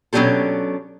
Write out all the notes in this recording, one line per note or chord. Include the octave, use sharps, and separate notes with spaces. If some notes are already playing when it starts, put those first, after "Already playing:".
B2 F#3 C#4 D4 G4 A4